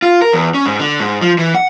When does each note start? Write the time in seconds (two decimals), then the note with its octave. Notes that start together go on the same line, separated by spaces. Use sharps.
0.02 F4
0.22 A#4
0.33 E2
0.54 C#4
0.66 G#2
0.79 D3
1.00 G#2
1.22 F3
1.38 E3
1.55 F#5